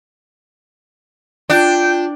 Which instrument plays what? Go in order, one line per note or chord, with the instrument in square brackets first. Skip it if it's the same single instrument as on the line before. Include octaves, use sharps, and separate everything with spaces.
[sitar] D4 [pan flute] F4 [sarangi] G5